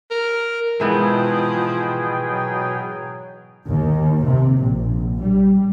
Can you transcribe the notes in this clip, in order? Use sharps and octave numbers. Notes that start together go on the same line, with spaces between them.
A#4
G#2 B2 E3 F3 B3 G#4 G5
F#3
D#2
C3
A#1
G3